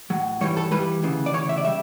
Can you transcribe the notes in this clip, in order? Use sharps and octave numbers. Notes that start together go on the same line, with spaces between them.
A2 F#3
G2 E3 G3 C#5
A4
G2 E3 G3 B4
D2 C#3 E3
D5
D2 C#3 E3 C#5
E5
D5
C#3 G3 E5